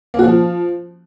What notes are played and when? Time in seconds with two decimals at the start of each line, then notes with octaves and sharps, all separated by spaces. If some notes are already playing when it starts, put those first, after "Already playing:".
0.14 A#3
0.19 F#4
0.24 F3